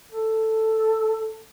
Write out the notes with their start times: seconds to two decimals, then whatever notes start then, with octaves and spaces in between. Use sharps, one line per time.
0.11 A4